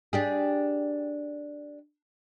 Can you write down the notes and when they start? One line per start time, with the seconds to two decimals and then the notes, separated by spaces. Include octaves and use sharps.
0.13 D4 G4 G#4